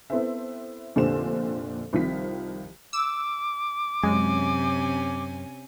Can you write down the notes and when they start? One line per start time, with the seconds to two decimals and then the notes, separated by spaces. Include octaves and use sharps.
0.10 B3 C4 E4 A4 C5 E5
0.96 F1 A#2 D3 G4 C5 E7
1.93 C2 D#3 F3 C4 B6
2.93 D6 E6
4.03 F#2 C3 G#3 C#4 G#5